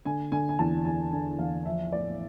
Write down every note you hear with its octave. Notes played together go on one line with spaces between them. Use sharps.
D3 G#5
D3 G#5
G#5
E2 A5
E2 G#5
D3 G#5
E2 F5
F3 E5
A2 D5